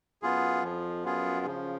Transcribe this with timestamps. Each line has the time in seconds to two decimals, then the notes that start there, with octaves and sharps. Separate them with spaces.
0.22 F#2 B3 F4 G#4
0.63 F2 F3
1.05 F#2 B3 F4 G#4
1.46 C#3 F3